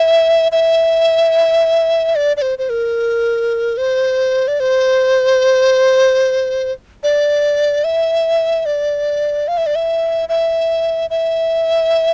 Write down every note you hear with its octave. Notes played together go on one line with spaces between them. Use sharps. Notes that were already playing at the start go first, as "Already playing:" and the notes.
Already playing: E5
E5
D5
D5
C5
C5
A#4
C5
D5
C5
D5
E5
D5
F5
E5
D5
E5
E5
E5